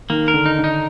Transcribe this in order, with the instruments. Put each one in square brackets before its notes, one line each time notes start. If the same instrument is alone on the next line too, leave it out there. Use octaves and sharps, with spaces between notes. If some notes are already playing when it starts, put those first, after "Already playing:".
[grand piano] D#3 [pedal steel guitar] A#3
[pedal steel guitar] A#4
[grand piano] D3
[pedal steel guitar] D#4
[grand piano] D3
[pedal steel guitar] D#4